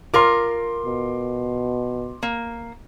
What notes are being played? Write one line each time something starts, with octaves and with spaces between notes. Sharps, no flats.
F4 A#4 C6 D6
B2
A#3